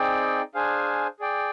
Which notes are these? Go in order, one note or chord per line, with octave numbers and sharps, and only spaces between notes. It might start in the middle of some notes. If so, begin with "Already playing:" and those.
Already playing: C4 D#4 G#4 D5 G5
D4 G#4 C5 F5 G#5
G#4 D5 G5